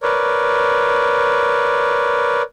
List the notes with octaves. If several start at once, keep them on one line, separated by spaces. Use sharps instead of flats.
A#4 B4 C#5 D5